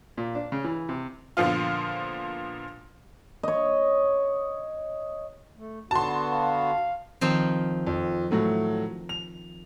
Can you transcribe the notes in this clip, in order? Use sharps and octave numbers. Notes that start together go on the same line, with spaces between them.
A#2
D4
C#3
E3
C3
A#2 D3 F3 B3 F4
C#5 D#5
A3
D3 B3 F#4 A5 C6
F5
D#3 F3 C4
F2
A2 F#3 A3
F7